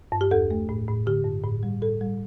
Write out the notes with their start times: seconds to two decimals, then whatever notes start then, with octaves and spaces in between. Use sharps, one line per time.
0.12 G2
0.21 G4
0.31 E2 A4
0.51 A3
0.69 A2
0.88 A2
1.06 D3 G4
1.25 G2
1.44 A2
1.63 G3
1.82 A2 A4
2.01 G3